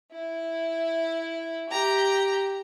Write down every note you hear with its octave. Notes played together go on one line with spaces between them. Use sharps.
E4
G4 A#5